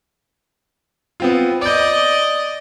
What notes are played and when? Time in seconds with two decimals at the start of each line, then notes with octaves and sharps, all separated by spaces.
1.20 B3 C4 F4
1.61 D5 D#5 D6 G6